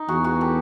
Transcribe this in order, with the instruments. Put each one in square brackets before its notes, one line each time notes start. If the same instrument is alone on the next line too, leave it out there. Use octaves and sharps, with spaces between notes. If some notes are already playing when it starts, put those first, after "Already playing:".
Already playing: [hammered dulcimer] D#4
[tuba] E2 [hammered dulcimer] F#4 G#4
[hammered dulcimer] F#4 G#4
G4 A4